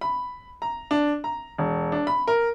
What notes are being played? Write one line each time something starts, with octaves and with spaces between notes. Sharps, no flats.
B5
A#5
D4
A#5
E1
D4
B5
A#4